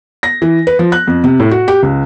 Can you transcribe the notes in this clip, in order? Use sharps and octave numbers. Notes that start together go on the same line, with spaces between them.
A#6
E3
B4
F3
F#6
F2
C3
A2
F#4
G4
C#2